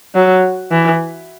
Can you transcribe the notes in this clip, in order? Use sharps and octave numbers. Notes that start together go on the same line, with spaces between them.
F#3
E3